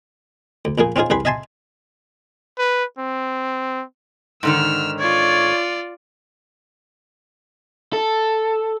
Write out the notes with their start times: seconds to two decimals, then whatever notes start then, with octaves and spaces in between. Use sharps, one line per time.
0.65 D2
0.78 A#1 A#2 A#3 G#4
0.96 C4 C#4 D#4 F4 G#4
1.10 C2 G3 G#4 B4 B5 C6
1.25 D#5 E5 G#5 A5 C6
2.58 B4
2.99 C4
4.43 G#2 D3 D#3 E6 F6
4.98 F4 C#5 D5
7.93 A4